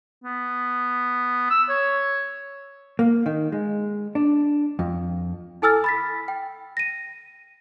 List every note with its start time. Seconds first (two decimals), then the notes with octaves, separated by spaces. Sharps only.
0.24 B3
1.50 E6
1.69 C#5
2.99 A#3
3.26 D#3
3.52 G#3
4.15 D4
4.79 F2
5.62 E4 A4 G#5 E6 F6 A6
5.84 B5 A6 B6
6.28 G5
6.77 A#6 D#7